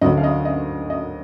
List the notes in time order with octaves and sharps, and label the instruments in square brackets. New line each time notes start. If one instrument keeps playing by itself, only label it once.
[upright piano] D2 D3 F#3 D#5
F5
D#5
D#5
D#5